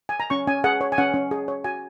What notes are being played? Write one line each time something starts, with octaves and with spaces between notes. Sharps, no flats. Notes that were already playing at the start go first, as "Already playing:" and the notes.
G#5
A#5
C#4 C#6
C#4 G#5
G#4 F#5
C#5
G#5
C#4 F#5
C#4
G#4
C#5
F#4 G#5